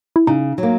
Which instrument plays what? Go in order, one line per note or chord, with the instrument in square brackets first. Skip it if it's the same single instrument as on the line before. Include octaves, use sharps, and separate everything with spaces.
[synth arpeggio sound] E4
[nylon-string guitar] C#3 [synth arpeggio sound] D#4
[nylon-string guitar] F#3
A#3